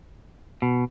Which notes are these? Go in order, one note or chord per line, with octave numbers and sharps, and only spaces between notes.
B2